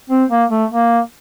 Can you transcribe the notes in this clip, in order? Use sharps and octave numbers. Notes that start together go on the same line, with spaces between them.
C4
A#3
A3
A#3